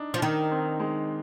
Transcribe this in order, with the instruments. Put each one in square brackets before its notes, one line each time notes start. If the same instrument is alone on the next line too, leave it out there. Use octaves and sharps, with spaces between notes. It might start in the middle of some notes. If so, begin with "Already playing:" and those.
Already playing: [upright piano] D4 D#4
[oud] F3
[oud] D#3 [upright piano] D#4
[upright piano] C4
G#3